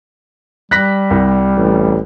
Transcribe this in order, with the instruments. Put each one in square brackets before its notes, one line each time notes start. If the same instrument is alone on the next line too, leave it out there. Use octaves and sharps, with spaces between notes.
[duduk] G3 [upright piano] F#6 A#6 B6
[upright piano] C2
[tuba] A1